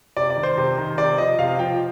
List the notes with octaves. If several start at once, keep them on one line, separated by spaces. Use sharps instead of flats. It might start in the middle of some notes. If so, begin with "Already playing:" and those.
C3 D5
D5
D#3
C5
C3
D#3
C3 D5
F3 D#5
C3 F5
F3 G5